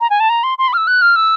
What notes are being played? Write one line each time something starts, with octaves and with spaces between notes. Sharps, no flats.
A#5
G#5
A5
A#5
C6
C6
B5
F6
E6
F#6
F6
E6